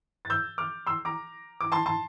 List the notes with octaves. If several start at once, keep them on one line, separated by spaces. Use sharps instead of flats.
A6
E6 G6
D6 F6
C6 E6
A#5 D6
D6
A5 C6
A5 C6